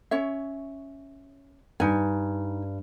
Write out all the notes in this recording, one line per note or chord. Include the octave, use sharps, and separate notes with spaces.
C#4 C#5 E5
G2 D#4 G#5